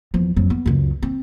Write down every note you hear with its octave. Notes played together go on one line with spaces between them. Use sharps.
E2 F3
F2 F#3
B3
C#2 F#2
C4